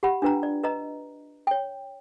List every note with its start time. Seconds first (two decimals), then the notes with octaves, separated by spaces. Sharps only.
0.03 G4 F#5 B5
0.22 D4 F4 B4 G5 A#5
0.43 D5
0.64 B4 D#5 A#5
1.47 C#5 G5